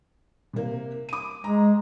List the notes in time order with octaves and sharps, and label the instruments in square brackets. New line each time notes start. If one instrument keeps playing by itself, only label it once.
[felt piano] C3 A#3
D6 D#7
[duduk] G#3 [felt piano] A#5